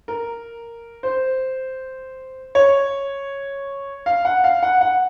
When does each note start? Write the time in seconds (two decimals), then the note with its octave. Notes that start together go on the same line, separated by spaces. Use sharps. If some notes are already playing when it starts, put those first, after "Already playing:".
0.08 A#4
1.03 C5
2.55 C#5
4.06 F5
4.25 F#5
4.44 F5
4.63 F#5
4.81 F#5